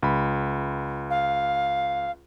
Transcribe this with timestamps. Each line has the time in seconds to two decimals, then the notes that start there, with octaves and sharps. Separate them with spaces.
0.03 C#2 B5
1.10 F5